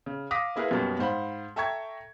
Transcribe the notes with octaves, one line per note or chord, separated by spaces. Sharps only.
C#3
F5 D6 D#6 A#6 B6
A#3 E4 G#4 A#4 B4 F5
F#2 B2 G3 A#3 B3
G#2 C5 F5 F#5 B5
A4 E5 G5 A#5 C#6 G#6